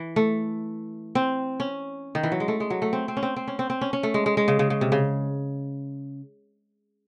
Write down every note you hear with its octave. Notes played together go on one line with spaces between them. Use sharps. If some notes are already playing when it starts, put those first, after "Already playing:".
Already playing: E3
A3
C4
C#4
D#3
E3
F#3
G#3
A3
G#3
F#3
A3
C4
C4
C#4
C4
C4
C#4
C4
C4
C#4
C#4
A3
G#3
G#3
G#3
C#3
C#3
C#3
C3
C#3